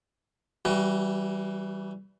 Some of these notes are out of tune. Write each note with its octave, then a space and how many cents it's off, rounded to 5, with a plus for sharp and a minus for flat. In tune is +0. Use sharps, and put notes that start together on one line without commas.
E3 -5 G3 -15 F#4 +25